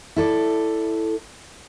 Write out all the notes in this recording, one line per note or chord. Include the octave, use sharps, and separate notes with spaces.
E4 A4 D5